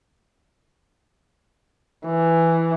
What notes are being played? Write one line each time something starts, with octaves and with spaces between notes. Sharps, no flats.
E3